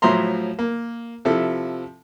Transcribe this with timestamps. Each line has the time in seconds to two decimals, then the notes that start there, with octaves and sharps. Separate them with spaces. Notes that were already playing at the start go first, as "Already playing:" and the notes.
0.02 A2 F3 F#3 E5 A#5 C6
0.59 A#3
1.25 C3 F3 E4 A4